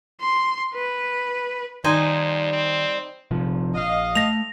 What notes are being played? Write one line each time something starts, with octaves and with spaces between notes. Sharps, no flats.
C6
B4
F2 D#3 G3 D#4 C5 G#5
C4
A#1 C3 F3
A#1 D#5 F5
A3 A#6 F7